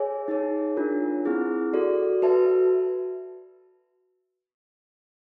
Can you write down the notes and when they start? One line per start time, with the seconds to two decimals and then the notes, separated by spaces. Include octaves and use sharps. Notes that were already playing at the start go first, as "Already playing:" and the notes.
Already playing: G#4 C#5 E5 G#5
0.28 D#4 G#4 C#5
0.77 D4 F4 A#4
1.25 C4 E4 G#4
1.73 F#4 A4 D5
2.22 F#4 B4 E5 A5